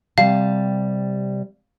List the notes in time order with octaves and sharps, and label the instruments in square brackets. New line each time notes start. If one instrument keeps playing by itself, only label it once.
[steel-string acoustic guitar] C3 G3 A5 [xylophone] F5